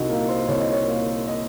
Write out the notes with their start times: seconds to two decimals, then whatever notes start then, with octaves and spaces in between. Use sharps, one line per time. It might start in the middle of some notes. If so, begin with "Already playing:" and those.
Already playing: C2 D#4 F#4
0.09 A#2 A#4
0.29 C5
0.48 C2 C#5
0.60 D#5
0.72 C#5
0.88 A#2
1.27 D#5